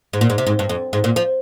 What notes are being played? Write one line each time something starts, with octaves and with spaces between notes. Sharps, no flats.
G#2
A#2
G#2
C3
G#2
G2
F2
G#2
A#2
F3